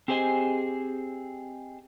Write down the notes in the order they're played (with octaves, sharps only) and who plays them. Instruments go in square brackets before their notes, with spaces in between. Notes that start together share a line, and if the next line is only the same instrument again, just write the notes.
[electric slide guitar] C4 G4 G#4 C5 D#5 G#5